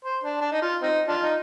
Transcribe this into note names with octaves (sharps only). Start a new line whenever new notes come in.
C5
D4
D4
D#4
F4
C4 D#4
D4 F4
D#4